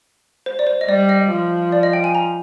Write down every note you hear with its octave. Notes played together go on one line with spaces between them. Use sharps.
C5
D5
C5
D#5
G3 D5
D#5
F3
D5
D#5
G5
G#5
A#5